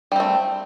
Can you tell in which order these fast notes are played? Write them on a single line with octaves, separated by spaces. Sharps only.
G3 C4 A3